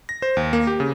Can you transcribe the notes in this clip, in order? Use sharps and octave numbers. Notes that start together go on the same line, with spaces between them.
A#6
C5
D#2
A#3
G4
C#3